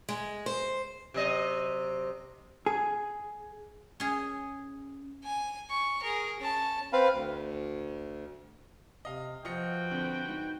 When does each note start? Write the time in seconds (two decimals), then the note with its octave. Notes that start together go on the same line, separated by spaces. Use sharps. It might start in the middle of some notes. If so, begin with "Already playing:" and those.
0.09 G#3
0.46 C5
1.14 C3 F#3 D#5
2.66 G#4
4.00 C#4 G#4
5.24 G#5
5.70 C#6
6.02 G#4 A#4
6.39 C#4 A5
6.93 C4 B4 F5
7.13 D2
9.05 C3 D#5 F5
9.45 F3 F4 F#4 B4 D#5 G5 C#7
9.91 F2 D3 F#7
10.28 G#2